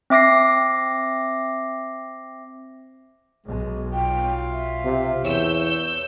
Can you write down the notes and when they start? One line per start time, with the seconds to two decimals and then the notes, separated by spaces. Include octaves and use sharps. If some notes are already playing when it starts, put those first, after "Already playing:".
0.10 C4 E5 D6 A#6 C7
3.46 B1 G#3
3.93 F4 G5
4.51 E5
4.84 C3
5.24 E2 C#5 E6 G6